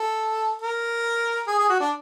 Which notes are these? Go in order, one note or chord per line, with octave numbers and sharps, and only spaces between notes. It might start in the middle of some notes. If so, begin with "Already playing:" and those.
Already playing: A4
A#4
G#4
G#4
F#4
D4